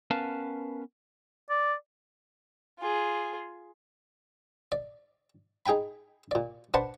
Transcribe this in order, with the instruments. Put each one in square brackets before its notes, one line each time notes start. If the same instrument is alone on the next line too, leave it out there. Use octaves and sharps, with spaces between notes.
[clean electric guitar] B3 C#4 A#4 B4 F5 A5
[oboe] D5
[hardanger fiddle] F4 G#4
[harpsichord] D5
D#4 G#4 G5 G#5 B5
A#2 D5
D4 B4 C5 F#5 A5 B5